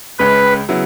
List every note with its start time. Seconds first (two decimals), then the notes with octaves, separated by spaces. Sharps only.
0.19 C#2 C#3 G#3 B4
0.69 C#3 F#3 B3 E4